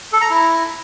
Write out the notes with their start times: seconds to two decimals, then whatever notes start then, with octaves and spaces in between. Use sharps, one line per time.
0.13 A4
0.21 A#5
0.30 E4